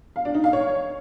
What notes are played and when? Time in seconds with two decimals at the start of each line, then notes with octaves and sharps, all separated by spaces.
0.16 F5
0.25 D4
0.34 D#4
0.44 F5
0.53 C#5